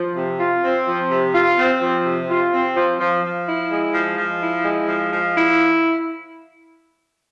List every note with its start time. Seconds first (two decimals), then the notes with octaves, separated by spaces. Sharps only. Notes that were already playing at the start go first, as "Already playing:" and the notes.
Already playing: F3
0.15 C3
0.39 F4
0.63 C4
0.86 F3
1.10 C3
1.34 F4
1.58 C4
1.81 F3
2.05 C3
2.29 F4
2.52 C4
2.76 F3
2.99 F3
3.23 F3
3.47 E4
3.70 G#3
3.94 F3
4.17 F3
4.41 E4
4.65 G#3
4.88 F3
5.12 F3
5.36 E4